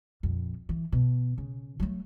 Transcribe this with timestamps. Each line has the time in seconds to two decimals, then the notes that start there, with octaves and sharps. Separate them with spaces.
0.23 A#1 F2
0.69 E3
0.92 B2
1.38 C#3
1.80 F#3 A3